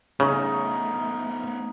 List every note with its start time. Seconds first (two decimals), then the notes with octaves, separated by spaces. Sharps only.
0.20 C#3 A3 B3 D#4 D#5